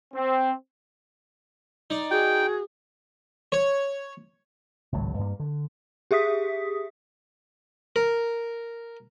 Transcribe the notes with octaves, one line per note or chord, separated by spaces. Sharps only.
C4
D#4 D5
F#4 G#4 G5
C#5
G#1 C#2 A2 F#3
G2 A#3
D3
G4 G#4 E5 D#6 B6
A#4